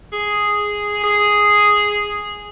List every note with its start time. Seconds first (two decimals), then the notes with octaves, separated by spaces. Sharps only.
0.13 G#4
1.04 G#4